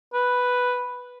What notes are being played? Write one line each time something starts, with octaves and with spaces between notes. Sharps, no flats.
B4